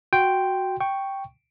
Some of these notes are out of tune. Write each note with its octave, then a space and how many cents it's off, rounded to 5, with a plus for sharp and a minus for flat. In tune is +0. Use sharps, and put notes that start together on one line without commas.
F#4 +0 G5 +0 C6 +0
G5 +0 C#6 +0